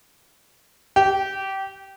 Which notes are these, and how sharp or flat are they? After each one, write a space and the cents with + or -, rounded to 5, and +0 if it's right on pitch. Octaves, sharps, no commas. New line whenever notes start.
G4 -20